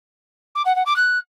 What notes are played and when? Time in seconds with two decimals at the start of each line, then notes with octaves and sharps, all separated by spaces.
0.55 D6
0.65 F#5
0.75 F#5
0.86 D6
0.96 F#6